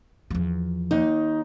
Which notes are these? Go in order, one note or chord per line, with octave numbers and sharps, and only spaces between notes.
E2 F3
D#2 D#4